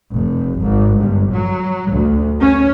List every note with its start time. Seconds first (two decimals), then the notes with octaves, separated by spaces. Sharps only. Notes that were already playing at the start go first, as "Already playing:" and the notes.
0.14 F1
0.62 G#1
0.99 G1
1.33 F#3
1.92 D2
2.41 C#4